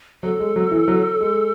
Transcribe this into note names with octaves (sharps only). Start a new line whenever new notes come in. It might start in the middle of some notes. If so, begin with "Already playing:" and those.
F#3 A4
G#3
F#3
E3
F#3
G#3